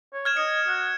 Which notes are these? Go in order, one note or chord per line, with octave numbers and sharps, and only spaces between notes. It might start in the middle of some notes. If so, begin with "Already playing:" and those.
C#5
F6 G#6 E7
D#5 C#7
F#4